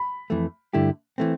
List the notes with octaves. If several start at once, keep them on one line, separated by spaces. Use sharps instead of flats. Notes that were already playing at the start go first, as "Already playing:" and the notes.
Already playing: B5
F2 E3 A3
G2 D3 A3 E4 G4
E3 A3 C4